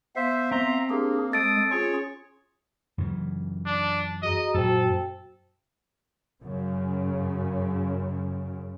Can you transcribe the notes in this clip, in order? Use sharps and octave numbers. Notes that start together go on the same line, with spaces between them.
B3 C5 E5 F5
C4 E5 A#5 C6
A#3 D4 G4 G#4
G#3 A4 D#6 A6 D7
C#4 F4 G#4 C#5 C#6
F#2 C#3 E3
D4
F#4 G#4 D#5 A#5
F#2 A#2 F#4 A4 C5 G5
F#2 C#3